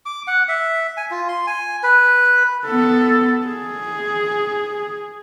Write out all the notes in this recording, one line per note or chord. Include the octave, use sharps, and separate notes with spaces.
D6
F#5
E5
G#5
F4
C6
G#5
B4
B3 A4
G#4